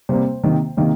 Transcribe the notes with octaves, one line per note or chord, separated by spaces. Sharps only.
C3 G3 A#3 C5
C3 D#3 A#3
C3 D#3 A#3